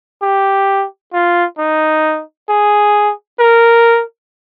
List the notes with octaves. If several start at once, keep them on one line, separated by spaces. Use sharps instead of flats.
G4
F4
D#4
G#4
A#4